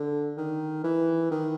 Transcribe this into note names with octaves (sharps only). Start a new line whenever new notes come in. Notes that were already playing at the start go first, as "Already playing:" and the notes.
Already playing: D3
D#3
E3
D#3